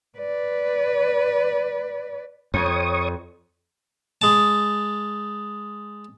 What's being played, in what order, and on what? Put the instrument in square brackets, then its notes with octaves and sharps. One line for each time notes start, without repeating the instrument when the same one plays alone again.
[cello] B4 D5
[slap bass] F2 [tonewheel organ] C#5 C#6 D#6
[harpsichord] G#3 A5